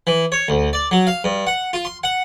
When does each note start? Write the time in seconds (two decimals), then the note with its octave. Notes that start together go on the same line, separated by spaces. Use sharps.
0.07 E3
0.32 C#5
0.48 D2
0.73 D5
0.91 F#3
1.07 F5
1.24 G2
1.47 F#5
1.73 F4
1.85 C6
2.04 F#5